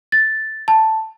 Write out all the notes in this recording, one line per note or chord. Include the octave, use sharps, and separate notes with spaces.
A6
A5